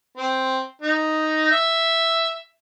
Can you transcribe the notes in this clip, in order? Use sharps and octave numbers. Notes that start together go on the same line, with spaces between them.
C4
D#4
E5